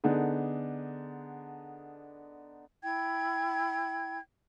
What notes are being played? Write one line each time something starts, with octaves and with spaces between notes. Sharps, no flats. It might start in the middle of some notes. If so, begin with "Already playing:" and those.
D3 B3 D4 D#4 G#4
E4 G5 G#6